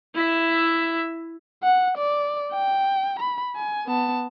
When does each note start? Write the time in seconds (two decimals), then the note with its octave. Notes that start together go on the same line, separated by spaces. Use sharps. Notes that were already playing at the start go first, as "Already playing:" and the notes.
0.15 E4 E5
1.63 F#5
1.97 D5
2.52 G5
3.19 B5
3.56 G#5
3.87 B3 A5